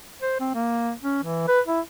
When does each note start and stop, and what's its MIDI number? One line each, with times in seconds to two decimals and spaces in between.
0.22 0.35 72
0.40 0.50 60
0.54 0.92 58
1.01 1.19 61
1.23 1.45 52
1.48 1.60 71
1.67 1.80 64